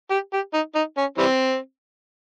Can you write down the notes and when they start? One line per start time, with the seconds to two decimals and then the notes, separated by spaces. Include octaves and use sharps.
0.11 G4
0.33 G4
0.54 D#4
0.75 D#4
0.97 C#4
1.18 E3 G3 C4